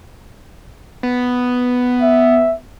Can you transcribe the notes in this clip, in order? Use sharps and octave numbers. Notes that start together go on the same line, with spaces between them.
B3
E5